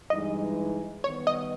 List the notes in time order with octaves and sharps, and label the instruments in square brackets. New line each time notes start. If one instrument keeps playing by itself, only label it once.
[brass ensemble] G2 E3 G#3 D#4 [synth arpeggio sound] D#5
[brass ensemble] D#3 G3 B3 [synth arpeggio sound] C#5
[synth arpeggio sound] D#5